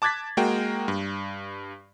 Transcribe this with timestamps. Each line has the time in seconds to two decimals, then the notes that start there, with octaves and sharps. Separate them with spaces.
0.02 A5 D6 F#6 G#6 A6 B6
0.37 G#3 A#3 F#4 A#4 G5
0.88 G2